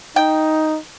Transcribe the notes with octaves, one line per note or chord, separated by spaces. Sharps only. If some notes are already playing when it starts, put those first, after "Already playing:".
D#4 G5